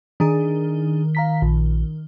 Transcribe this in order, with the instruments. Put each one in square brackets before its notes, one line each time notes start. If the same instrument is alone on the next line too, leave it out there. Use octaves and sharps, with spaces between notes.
[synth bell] D#3 [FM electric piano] D4 G#4
[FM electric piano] F5 A#5 B6
A#1